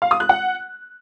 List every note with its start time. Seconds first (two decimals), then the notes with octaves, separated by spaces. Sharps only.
0.02 F5
0.11 D#6
0.20 F#6
0.29 F#5